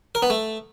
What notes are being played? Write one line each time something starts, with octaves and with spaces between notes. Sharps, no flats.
A#4
B3
A3